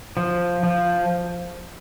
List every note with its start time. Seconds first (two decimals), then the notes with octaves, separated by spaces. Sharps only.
0.17 F3
0.63 F3